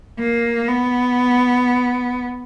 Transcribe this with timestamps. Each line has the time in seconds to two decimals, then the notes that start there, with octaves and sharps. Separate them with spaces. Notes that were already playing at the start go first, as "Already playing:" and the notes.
0.19 A#3
0.69 B3